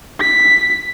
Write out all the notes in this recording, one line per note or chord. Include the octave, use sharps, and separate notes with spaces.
B6